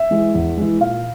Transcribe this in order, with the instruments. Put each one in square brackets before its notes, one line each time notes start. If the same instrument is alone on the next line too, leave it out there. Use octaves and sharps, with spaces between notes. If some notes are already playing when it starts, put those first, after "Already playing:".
Already playing: [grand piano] E5
E3 G#3
E2
E3 G#3
A#2 F5